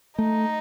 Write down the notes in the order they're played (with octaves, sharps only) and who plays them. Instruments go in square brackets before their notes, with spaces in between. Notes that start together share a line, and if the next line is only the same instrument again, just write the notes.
[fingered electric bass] A3 [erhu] D#4